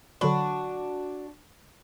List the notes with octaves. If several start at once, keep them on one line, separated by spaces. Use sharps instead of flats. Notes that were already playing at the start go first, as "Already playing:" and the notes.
D3 F#3 D4 F#4 B5